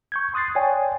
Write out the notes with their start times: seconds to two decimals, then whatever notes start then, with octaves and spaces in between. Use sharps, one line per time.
0.12 C#6 G6 G#6
0.34 C6 D#6 F#6 A6 C7
0.55 C#5 D5 G5 G#5